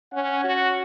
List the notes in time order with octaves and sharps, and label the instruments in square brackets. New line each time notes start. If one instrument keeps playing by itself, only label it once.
[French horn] C#4 [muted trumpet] F#5
[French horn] F#4